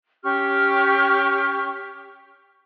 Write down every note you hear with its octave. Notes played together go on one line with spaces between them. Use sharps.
C#4 G4 C#6 F6